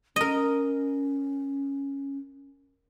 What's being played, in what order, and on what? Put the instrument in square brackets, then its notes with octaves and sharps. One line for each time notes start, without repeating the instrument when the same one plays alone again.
[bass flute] C#4 [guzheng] A#4 D#5